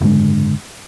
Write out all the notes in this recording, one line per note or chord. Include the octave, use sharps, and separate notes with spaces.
F#1 G#2 D3 G#3